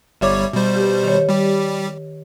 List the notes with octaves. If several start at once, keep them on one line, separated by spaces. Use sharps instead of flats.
G1 G3 C#5 E5 D6
B2 G3 C5
G4 B4
D#3 C#5
G3 G4